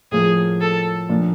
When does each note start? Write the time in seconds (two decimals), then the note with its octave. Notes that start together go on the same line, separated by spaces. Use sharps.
0.12 A2 F3 A#3 G#4
0.61 A4
1.09 A#2 F3 A#3 D4